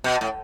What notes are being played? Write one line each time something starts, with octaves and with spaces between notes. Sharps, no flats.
B2
A2